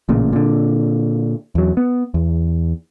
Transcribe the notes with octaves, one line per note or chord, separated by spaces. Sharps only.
A1 A#2 C#3
A#2 D3
E2 F#3
B3
E2